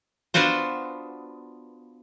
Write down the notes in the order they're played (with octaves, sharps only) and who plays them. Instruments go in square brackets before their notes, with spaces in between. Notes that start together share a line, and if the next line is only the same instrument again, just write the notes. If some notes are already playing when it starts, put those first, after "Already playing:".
[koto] B3 D4 F4 F#4 C5